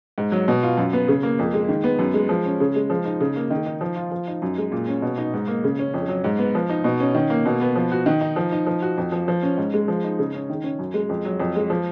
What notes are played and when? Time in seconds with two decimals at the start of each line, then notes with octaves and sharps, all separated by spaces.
0.18 G#2
0.32 F#3
0.48 B2
0.63 F4
0.77 F#2
0.93 B3
1.08 C#3
1.23 A#3
1.39 F2
1.54 G#3
1.68 D#3
1.84 B3
1.99 F#2
2.14 G#3
2.29 F3
2.45 C#4
2.60 C#3
2.76 G#3
2.90 F3
3.05 D#4
3.21 C#3
3.36 A#3
3.50 D#3
3.66 D#4
3.81 F3
3.96 F4
4.11 F3
4.27 D#4
4.42 F#2
4.58 G#3
4.72 A#2
4.88 C#4
5.02 B2
5.18 D#4
5.34 G#2
5.48 A#3
5.64 C#3
5.79 C#4
5.94 F2
6.08 F#3
6.24 G#2
6.39 B3
6.55 F3
6.70 D#4
6.84 B2
7.00 C#4
7.15 D#3
7.30 A#3
7.46 B2
7.61 B3
7.76 F3
7.91 F#4
8.06 D#3
8.21 D#4
8.36 F3
8.52 D#4
8.66 F3
8.82 F#4
8.98 F2
9.12 F3
9.28 F3
9.43 C#4
9.57 G#2
9.74 G#3
9.88 F3
10.04 D#4
10.19 C#3
10.33 C#4
10.50 D#3
10.64 C#4
10.79 F#2
10.94 G#3
11.09 F2
11.25 F#3
11.40 F2
11.56 G#3
11.70 F3